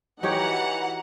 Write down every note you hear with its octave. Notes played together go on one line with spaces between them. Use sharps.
E3 D#4 F#4 G4 C#5 F#5 A#5